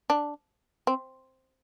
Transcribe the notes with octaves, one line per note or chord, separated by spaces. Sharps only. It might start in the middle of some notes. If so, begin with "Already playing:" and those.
D4
C4